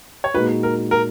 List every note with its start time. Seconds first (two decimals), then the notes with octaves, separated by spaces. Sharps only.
0.24 C#5
0.34 A#2 G#3 D#4 F#4 B4
0.63 A#4
0.91 A#4